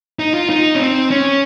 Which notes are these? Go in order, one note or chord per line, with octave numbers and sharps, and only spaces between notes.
D#4
F4
D#4
C#4
C4
C#4